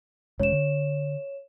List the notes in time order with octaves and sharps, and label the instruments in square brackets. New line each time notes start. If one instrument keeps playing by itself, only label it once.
[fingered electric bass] E1 G#3 C#4 [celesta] C#5 E7
[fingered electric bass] D3